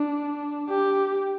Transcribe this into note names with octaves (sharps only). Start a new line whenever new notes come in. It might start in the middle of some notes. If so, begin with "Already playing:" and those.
Already playing: D4
G4